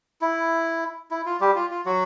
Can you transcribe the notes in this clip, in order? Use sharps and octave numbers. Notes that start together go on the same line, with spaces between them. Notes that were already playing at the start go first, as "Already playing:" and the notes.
E4
E4
F4
G3 G4
F4
F4
F#3 F#4